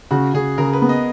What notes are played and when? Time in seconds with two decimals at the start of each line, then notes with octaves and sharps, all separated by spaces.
0.11 C#3 F#4
0.34 C#3 G#4
0.58 C#3 A#4
0.73 B4
0.82 B3
0.89 D#5